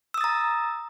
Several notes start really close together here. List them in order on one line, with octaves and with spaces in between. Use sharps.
E6 D#6 A6 A#5